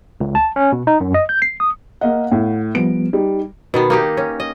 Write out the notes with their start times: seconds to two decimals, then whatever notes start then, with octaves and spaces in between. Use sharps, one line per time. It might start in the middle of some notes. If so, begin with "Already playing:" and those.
0.21 C#2
0.35 A5
0.56 C#4
0.72 B2
0.87 D#4
1.00 F#2
1.14 D#5
1.29 G6
1.42 C7
1.60 D#6
2.01 A#3 D#5 F5 F#5
2.31 A2
2.75 F3 G3 B3 D7
3.13 G3 D#4
3.74 B2 D#3 B3
3.90 A#3 D#4 G4
4.17 C#4
4.40 D#5